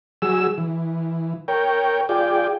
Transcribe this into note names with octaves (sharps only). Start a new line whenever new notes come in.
F#3 G#4 E6
E3
A#4 C#5 G5
F4 G#4 D5 G5